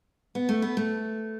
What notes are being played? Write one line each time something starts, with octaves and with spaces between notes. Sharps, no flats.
B3
A3
B3
A3